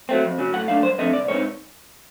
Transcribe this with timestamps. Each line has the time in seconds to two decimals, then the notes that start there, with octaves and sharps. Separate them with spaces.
0.09 F#3 A3 C4
0.24 F2
0.38 C#3 F#3
0.53 A2 F#5
0.68 F#3 A3 D4 F5
0.83 G2 C5
0.99 D3 F3 A3 C4 D#5
1.13 C2 D5
1.28 B2 G#3 C4 D#4 C#5